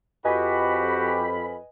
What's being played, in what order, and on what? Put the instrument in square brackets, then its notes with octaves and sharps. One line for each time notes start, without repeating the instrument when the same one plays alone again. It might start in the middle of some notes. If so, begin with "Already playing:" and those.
[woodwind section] F2 B5 [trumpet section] F#4 G4 [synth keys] B4 D#5 G#5